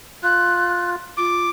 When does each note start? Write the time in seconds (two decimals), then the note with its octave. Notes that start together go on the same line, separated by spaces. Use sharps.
0.23 F4 F#6
1.17 F4 D6